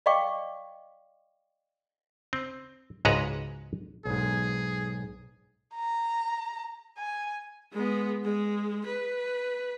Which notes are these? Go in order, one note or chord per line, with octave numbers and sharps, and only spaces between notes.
D5 D#5 F5 G5 C#6 D6
C4
C#2 G#2 G#3 F#4 B4 A#5
B1 G#2 G#4
A#5
G#5
G#3 B3
G#3
B4